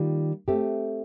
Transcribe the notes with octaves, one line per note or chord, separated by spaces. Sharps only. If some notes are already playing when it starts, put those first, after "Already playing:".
Already playing: D#3 G3 A#3 F4
A3 C4 G4